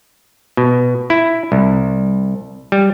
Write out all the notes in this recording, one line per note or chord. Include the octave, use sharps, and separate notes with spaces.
B2
E4
C2
G3